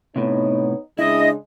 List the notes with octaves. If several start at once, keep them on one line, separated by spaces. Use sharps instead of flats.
A2 C3 B3 D#4 C#5
C#3 G#3 D4 E4 D#5 E5